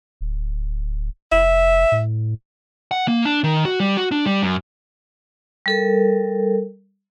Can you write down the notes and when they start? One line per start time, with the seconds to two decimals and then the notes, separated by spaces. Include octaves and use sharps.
0.21 D1
1.32 F1 E5
1.92 A2
2.91 F#5
3.08 A#3
3.25 D4
3.44 D#3
3.65 F#4
3.80 G3
3.97 F#4
4.11 D4
4.26 G3
4.43 F#2
5.66 G3 A4 A#4